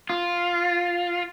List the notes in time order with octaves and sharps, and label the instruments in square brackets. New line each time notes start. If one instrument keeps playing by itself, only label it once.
[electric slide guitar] F4